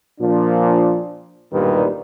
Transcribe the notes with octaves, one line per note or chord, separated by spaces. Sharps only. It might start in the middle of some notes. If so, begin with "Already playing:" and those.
A#2 F3 D4
B1 G2 A#2 D#3 G3 B4